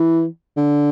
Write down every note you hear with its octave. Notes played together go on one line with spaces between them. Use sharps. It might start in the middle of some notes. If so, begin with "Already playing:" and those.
Already playing: E3
D3